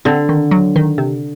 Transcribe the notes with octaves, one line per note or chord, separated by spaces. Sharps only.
D3 C4
D#3
F#3
D#3
C3